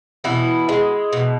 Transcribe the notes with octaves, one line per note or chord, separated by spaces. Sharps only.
B2 E3 E4
G#3
B2